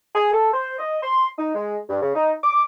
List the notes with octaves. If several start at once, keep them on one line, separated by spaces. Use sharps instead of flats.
G#4
A4
C5
D#5
C6
D#4
G#3
G2
C#3
D#4
D6